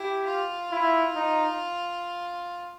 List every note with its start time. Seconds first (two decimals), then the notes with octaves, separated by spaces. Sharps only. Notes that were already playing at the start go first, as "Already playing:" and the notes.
Already playing: E4 G4
0.26 F4
0.71 E4
1.15 D#4